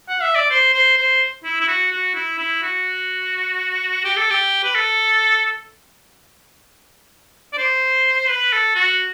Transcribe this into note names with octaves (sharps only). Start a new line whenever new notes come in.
F#5
E5
D5
C5
C5
C5
E4
E4
F#4
F#4
E4
E4
F#4
G4
A4
G4
B4
A4
D5
C5
B4
A4
F#4